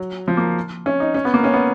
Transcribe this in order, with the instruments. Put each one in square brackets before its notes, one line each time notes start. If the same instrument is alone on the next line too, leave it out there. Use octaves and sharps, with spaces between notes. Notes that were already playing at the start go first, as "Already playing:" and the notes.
Already playing: [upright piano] F#3
F3
A#3
C#4
D#4
C#4
B3
A#3
C#4
B3